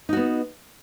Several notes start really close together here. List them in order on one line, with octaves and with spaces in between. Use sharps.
D#4 F#4 B3